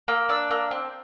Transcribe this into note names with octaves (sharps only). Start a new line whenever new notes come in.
A#3 E6
D4 E6
A#3 E6
C4